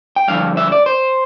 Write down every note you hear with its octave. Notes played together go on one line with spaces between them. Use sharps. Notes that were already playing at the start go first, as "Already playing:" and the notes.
G5
G2 D3 F3 F5
E5
D5
C5